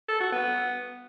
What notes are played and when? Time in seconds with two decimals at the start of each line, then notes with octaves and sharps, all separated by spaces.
0.09 A4
0.21 F#4
0.32 B3